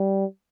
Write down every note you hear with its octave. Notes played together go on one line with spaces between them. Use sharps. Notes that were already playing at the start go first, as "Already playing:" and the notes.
Already playing: G3